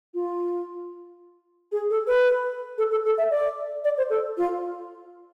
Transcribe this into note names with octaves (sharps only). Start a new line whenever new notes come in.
F4
G#4
A4
B4
A4
A4
A4
E5
D5
D5
C5
A4
F4